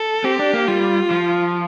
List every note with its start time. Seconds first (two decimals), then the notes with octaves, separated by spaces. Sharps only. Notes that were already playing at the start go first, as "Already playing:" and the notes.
Already playing: A4
0.24 C4 G4
0.39 D4
0.53 A#3
0.68 G3 F4
1.11 F3